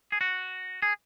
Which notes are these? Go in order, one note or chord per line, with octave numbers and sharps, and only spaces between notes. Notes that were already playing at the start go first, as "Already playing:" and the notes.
G#4
F#4
G#4